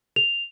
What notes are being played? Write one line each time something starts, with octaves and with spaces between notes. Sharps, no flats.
F7